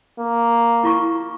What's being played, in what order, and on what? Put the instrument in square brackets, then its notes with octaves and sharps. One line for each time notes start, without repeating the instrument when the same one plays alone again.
[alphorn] A#3
[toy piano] E4 F4 C#6